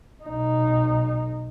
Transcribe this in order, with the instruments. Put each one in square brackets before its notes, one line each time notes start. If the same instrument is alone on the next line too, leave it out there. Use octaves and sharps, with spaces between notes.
[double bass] B1 D#4